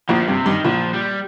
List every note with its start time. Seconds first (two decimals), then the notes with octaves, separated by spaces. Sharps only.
0.09 A#1 A#2 F3
0.19 A#2
0.28 G2 C3
0.46 G2 D#3
0.64 A#1 A#2 F3
0.93 G3